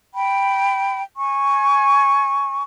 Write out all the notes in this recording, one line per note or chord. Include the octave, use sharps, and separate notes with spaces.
G5 B5
G#5 C#6